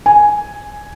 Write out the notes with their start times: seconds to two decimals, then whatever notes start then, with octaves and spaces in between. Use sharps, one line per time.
0.06 G#5